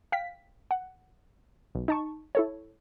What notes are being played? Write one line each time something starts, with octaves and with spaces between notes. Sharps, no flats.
F5 G5 B6
F#5
B1
D#4 A5 C#6
E4 A4 C#5